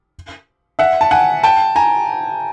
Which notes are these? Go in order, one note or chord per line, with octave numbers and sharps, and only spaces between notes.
E5 F#5
A5
F#5 G#5
G5 A5
G#5 A#5